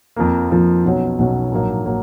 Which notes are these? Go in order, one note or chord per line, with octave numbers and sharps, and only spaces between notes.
F2 F3 A#3
F2 F3 A#3
B1 B2 F#3 C#4
B1 B2 F#3 C#4
A#1 G#2 F#3 A#3
F#3 A#3